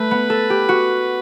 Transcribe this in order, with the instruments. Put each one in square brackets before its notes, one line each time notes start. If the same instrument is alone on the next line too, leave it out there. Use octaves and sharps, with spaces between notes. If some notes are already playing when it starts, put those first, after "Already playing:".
Already playing: [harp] A3 [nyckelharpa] B4
[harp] B3
A4
G4
F#4